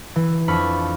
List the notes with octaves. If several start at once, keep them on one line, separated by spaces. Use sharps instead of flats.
E3
F2 D4 B5 C#6 F6